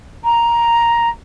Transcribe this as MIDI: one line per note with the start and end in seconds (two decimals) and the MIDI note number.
0.24 1.09 82